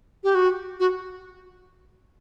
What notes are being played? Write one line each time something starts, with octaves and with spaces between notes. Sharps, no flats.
G4
F#4
F#4